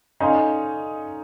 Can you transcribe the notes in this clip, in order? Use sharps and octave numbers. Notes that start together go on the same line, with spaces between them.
C#4 D#4 A4 D5 F5 G#5 C6